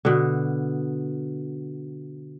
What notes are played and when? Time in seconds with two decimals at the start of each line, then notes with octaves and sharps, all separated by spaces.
0.05 B2 D3